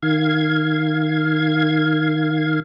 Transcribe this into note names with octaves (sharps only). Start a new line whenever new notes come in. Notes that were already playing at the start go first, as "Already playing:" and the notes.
D#3 F5 G#6